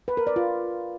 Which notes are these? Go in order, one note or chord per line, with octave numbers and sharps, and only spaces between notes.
B4
A#4
D5
F4